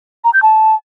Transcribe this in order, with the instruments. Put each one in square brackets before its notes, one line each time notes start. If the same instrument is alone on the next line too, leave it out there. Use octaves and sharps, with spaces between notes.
[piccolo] A#5
G6
A5